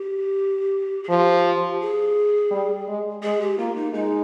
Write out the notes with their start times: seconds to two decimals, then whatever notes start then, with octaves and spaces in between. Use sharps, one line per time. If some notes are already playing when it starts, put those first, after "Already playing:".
Already playing: G4
1.04 G#4
1.09 F3 G4
1.81 G#4
2.51 G3
2.88 G#3
3.23 G#3 G#4
3.41 G4
3.58 A#3 F4
3.76 D#4
3.93 G#3 D#4